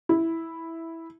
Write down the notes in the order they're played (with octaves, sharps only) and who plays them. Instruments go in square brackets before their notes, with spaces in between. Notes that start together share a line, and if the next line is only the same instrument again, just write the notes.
[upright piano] E4